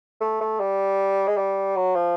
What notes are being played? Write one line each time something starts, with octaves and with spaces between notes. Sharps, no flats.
A3
A3
G3
G#3
G3
F#3
F3